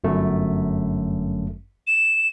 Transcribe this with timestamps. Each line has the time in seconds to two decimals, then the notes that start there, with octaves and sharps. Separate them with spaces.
0.04 G1 F#2 A3
1.87 E7